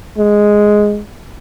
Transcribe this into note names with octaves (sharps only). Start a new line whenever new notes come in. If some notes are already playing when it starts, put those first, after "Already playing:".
G#3